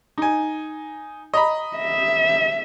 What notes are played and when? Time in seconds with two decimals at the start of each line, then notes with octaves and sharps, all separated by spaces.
0.18 D#4 G#5
1.34 D#5 A#5 B5
1.77 E5